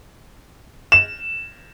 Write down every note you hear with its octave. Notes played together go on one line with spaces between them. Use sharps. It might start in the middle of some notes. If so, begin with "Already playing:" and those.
E7